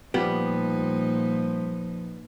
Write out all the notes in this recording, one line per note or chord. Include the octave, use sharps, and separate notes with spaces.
A#2 F3 G3 B3 D#4 F4 G4